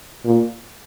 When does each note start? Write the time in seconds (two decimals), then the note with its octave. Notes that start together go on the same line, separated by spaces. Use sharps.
0.25 A#2